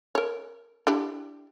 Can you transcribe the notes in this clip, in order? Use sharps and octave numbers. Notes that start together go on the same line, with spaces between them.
A#4 C#5
D4 E4 G4